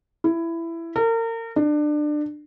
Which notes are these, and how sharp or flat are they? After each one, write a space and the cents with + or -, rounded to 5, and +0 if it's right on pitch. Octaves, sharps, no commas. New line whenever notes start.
E4 +15
A#4 -35
D4 +25